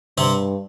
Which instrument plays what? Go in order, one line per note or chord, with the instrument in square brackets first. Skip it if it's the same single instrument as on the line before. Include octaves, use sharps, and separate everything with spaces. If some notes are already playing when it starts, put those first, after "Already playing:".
[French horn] G2 [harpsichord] C3 C4